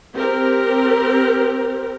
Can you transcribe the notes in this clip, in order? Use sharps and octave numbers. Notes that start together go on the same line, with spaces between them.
C4 G4 A#4